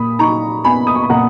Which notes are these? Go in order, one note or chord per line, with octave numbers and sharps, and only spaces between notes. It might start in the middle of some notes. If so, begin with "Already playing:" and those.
Already playing: A#2 B5 D#6
D#4 A#5 C#6
B3 G#5 B5
D#6
C#6
B5
A#2 F#5 A#5